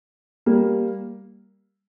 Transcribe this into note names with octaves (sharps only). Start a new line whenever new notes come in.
G3 A#3